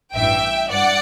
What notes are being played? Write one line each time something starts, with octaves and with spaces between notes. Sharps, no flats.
A1 G2 E3 E5 G5
G2 D5 F#5